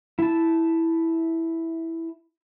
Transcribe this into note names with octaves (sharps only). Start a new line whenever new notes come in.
E4 A5